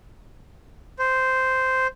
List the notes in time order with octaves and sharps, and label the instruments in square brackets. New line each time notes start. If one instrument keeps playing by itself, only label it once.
[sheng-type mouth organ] C5